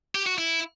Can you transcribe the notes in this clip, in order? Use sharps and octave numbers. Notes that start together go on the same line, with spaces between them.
G4
F#4
E4